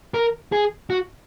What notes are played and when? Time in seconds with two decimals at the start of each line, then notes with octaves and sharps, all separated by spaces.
0.14 A#4
0.53 G#4
0.90 F#4